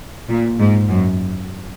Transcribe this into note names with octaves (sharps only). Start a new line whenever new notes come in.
A#2
G#2
F#2